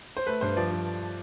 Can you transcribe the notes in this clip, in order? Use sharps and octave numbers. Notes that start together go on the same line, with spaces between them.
C5
A3 B4
G2 C5
F3 D5
F3